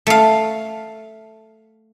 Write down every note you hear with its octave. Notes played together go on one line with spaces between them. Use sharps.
A3 F5